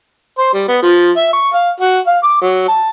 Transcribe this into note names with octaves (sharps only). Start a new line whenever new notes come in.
C5
G3
B3
F3
E5
C#6
F5
F#4
F5
D6
F#3
A5